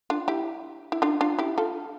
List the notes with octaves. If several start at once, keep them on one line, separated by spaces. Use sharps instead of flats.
D4 F4
E4 G4
E4
D4 F4
D4 F4
E4 G4
F4 A4